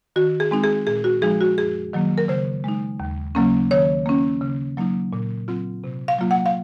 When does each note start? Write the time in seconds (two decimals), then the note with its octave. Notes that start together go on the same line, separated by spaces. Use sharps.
0.16 D#3 F#4
0.40 G#4
0.51 G#3 C4 D#4
0.64 G#4
0.87 A#2 G#4
1.04 F#4
1.22 F3 G#3 D#4 G#4
1.41 F#4
1.58 F#2 G#4
1.93 D#3 F#3 A#3
2.18 A#4
2.28 C#3 C5
2.64 G#3 D#4
3.00 D#2
3.35 C#3 F#3 A#3 C#4
3.71 D#3 C#5
4.06 A#3 C#4
4.41 C#3
4.77 F#3 A#3 D#4
5.13 A#2
5.48 F#3 C4 F4
5.84 C3
6.08 F5
6.19 F#3 A#3 F4
6.31 F#5
6.46 F5